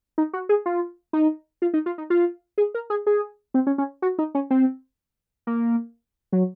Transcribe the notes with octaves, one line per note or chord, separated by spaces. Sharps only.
D#4
F#4
G#4
F4
D#4
F4
D#4
F4
D#4
F4
G#4
A#4
G#4
G#4
C4
C#4
C#4
F#4
D#4
C#4
C4
A#3
F#3